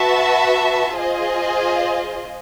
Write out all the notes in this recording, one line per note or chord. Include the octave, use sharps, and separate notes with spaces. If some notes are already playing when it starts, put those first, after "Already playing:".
Already playing: F#4 B4 E5 A5
F4 G#4 C5 D#5